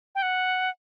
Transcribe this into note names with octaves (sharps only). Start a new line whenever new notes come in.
G5
F#5